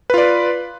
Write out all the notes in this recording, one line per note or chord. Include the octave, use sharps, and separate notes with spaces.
F4 B4 D5